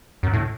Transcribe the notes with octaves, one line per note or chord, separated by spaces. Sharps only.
F#2
A2